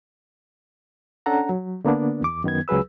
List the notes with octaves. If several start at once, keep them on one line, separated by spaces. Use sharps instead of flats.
C#4 D4 A4 F#5 A#5
F#3
D3 A#3 B3 D4
E2 D6
F#2 D#3 B3 G#6
C#2 F#3 G#4 B4 E6